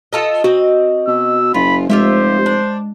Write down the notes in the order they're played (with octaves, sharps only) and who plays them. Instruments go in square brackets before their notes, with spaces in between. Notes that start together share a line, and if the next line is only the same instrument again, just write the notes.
[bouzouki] F4 A4 D#5
[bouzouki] C4 D#5 [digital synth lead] F#4
[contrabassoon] B2 [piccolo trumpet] E6
[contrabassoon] F#1 [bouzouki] F4 [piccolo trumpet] B5
[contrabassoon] F1 [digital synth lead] G#3 [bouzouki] F4 G4 E5 [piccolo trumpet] C5
[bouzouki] D4